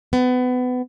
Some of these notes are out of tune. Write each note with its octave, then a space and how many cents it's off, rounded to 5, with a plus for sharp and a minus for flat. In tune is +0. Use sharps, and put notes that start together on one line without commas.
B3 +25